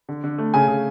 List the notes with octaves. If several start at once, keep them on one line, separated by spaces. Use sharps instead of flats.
D3
D3
A3
C#3 G#5
C#3